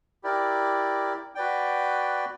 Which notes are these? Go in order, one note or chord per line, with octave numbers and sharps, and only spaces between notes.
E4 G4 A#4 D5
F#4 B4 D5 G5